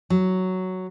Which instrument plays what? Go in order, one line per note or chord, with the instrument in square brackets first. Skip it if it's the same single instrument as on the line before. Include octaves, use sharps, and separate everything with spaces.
[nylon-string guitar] F#3